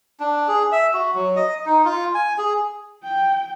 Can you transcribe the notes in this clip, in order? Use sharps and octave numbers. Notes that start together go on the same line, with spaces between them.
D4
G#4
E5
F#4
F#3
D#5
D#4
F4
G#5
G#4
G5